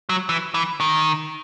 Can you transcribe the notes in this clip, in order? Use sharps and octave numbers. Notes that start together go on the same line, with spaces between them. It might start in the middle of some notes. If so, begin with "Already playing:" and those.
F#3
E3
E3
D#3